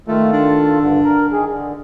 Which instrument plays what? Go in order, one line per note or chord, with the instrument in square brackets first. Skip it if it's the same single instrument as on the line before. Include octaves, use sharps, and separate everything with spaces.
[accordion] D#3 F4 A4 [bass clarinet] A3
[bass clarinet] D4
[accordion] G2 D3
A#4
D#3 G#4
D3